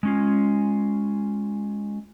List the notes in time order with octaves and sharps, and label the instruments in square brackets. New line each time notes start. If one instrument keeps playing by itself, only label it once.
[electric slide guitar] G#3 C#4 F4